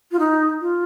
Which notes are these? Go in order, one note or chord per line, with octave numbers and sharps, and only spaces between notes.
F4
D#4
F4